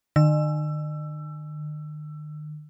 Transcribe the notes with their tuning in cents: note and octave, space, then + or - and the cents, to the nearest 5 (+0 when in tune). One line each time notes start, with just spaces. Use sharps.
D#3 -45 E6 +20